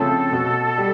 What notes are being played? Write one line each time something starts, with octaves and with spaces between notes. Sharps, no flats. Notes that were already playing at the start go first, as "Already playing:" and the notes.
Already playing: C#3 F3 A3 C4 A4
B2
G3